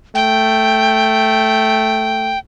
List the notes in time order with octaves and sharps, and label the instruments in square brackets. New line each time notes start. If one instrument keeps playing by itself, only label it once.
[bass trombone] A3 [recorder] G5